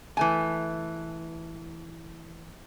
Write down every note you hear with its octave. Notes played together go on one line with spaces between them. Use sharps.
E3 A3 G#5